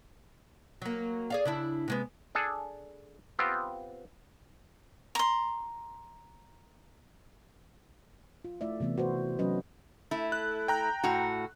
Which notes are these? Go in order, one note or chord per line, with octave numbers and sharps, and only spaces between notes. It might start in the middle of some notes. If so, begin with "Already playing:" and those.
F#3 A#3
G#4 D5 F5
C#3 D4 E4
C3 G#3 B3
D4 G#4 A4
B3 C4 F4 G4
A#5 C6
F4
A3 E4 D5 E5
C3 E3 A3 B3
F#4 B4 C5
F#3 C#4 F#4 B4 D#5
A3 E4
F#6
G5 A#5 F#6
A2 F#4